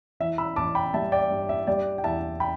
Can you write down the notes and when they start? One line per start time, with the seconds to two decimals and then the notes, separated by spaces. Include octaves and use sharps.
0.20 E3 E5
0.38 B5 E6
0.56 A1 A5 D6
0.75 G5 B5
0.94 G3 E5 A5
1.12 D5 G5
1.30 G2
1.49 E5
1.67 G3 D5 G5
1.98 G5
2.04 E2 E5 A5
2.40 G5 B5